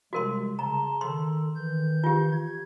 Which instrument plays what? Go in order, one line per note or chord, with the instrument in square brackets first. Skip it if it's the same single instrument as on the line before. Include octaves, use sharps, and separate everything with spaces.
[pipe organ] C3 G3 G#3 [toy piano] F#4 A#4 C6
[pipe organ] C#3 A5 C6 [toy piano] A#5
[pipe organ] D#3 A4 [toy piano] C6
[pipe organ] D#3 E3 G6
[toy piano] F4 G4
[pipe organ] G#6